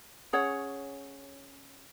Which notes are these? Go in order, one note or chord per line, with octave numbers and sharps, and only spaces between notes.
C#4 G#4 C#5 F#5